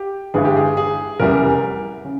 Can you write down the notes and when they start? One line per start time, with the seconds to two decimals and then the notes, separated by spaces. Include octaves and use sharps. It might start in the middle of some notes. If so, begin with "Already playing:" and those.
Already playing: G4
0.34 G1 G2 E3 G#3 G#4
0.45 G4
0.57 G#4
0.77 G#4
1.20 F1 E2 C#3 E3 G3 A#4
2.05 C#3